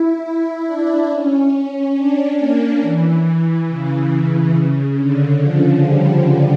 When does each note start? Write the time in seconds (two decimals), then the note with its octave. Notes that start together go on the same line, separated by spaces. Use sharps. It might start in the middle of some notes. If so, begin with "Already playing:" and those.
Already playing: E4
0.24 E4
0.66 D4
1.10 C#4
1.96 D4
2.39 A#3
2.82 E3
3.68 C#3
4.55 C#3
4.97 D3
5.40 F3
5.83 G3